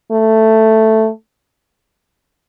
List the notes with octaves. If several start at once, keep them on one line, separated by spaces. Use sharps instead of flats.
A3